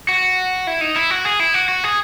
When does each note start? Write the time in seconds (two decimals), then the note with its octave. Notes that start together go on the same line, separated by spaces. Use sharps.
0.09 F#4
0.67 E4
0.81 D#4
0.96 E4
1.10 F#4
1.25 G#4
1.40 E4
1.54 F#4
1.69 F#4
1.84 G#4